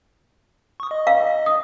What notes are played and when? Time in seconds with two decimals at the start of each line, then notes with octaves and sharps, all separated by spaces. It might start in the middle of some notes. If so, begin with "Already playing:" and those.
0.80 C#6 D#6
0.91 D#5
1.07 F5
1.46 D#6